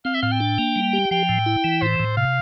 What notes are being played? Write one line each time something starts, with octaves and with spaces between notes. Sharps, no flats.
C4 F5
E5
A2 F5
G5
D4
A#3
G3
G4
F3 G5
A2
E4
E3
A2 C5
A2
C3 F5